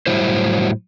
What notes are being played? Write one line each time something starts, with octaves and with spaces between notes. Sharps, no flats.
A2 F#3 G3 E4 C5